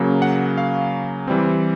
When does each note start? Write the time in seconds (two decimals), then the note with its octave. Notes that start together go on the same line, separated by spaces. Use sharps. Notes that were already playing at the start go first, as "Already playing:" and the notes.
Already playing: C#3 F#3 A#3
0.22 F#5
0.58 F5
1.27 E3 G3 C4